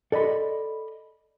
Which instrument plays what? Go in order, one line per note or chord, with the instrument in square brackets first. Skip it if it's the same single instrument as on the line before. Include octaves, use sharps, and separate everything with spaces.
[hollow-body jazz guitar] A4 D5 D#5 B5 C6